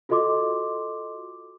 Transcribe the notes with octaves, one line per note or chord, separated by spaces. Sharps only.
F4 F#4 A4 D#5 C6 D6